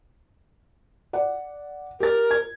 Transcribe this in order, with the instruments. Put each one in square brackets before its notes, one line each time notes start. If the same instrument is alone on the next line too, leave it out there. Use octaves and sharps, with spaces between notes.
[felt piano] D5 F#5
[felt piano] G4 A6 [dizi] A#4
[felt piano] G#6